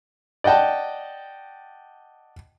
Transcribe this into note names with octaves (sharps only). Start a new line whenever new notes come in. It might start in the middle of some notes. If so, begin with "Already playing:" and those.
D5 D#5 F#5 G5 A5